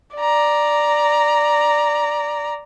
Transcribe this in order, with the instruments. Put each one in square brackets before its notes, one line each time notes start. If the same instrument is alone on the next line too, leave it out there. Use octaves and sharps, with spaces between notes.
[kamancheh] D5 A#5